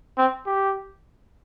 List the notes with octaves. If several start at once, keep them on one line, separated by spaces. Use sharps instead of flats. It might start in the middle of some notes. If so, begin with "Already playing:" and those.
C4
G4